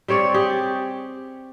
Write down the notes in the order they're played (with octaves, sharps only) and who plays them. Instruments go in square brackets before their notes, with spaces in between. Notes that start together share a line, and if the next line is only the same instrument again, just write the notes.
[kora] G3 C4 C#5 D5
G4 G#4